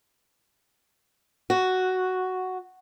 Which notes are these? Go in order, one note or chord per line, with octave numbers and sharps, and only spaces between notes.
F#4